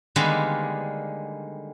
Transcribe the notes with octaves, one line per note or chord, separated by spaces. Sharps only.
D3 D#3 G3 G#3 A#3 B3